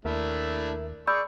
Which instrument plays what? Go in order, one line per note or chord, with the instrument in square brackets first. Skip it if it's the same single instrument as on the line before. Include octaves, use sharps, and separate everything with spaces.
[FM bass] D#2 [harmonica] A3 D4 E4 [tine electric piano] A#4 E5
[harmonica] G#4 C#6 [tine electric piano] D5 [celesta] B5 E6 G6